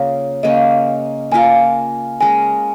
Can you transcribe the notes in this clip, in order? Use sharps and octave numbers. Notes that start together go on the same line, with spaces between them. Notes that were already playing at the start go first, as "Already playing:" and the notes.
Already playing: C#3 A#3 F4 A#4 C#5
C#3 A#3 C#4 D#5
A#3 F4 A#4 G#5
G#3 C#4 A#4 G#5